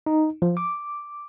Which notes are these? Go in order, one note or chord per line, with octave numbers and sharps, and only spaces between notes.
D#4
F3
D6